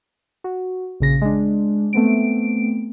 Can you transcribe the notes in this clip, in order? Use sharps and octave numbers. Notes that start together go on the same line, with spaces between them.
F#4
A#1 C#3 A#6
G#3 D4
A3 B3 C4 D7